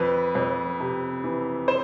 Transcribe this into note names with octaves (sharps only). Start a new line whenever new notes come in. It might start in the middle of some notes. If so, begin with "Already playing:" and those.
Already playing: F2 B4
F2
C3
E3
C5